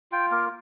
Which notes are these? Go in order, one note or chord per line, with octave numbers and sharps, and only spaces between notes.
F4 G5
A#3 A#4